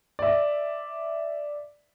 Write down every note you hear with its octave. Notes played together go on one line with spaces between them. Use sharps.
D5 E5